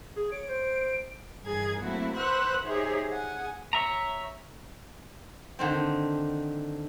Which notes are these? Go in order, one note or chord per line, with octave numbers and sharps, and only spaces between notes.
G#4
C#5 D7
C5
G2 E3 G#4 A#4 G#6
F#3 A3 A#3 C4 E4 F#4
B4 C5 F#5 C#6 E6 F#6
D#4 G4 G#4 C5 C#5 E5
G#4 F#5 G#5
C#5 E5 A#5
D3 D#3 C4